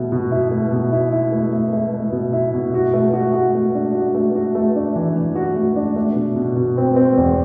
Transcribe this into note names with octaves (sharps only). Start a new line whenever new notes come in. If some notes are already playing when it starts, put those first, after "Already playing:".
Already playing: B2 A3 E4
B2
E4
A3
B2
E4
E4
A3
A3
A3
A3
B2
E4
B2
F#4
A3
F#4
F#4
A3
D4
F#4
A3
F#4
A3
D4
E3
E3
F#4
A3
D4
A3
B2
B2
B2
C4
C4
E2